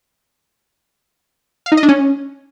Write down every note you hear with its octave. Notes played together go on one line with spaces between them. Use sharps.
F5
D#4
D#5
D4
C#4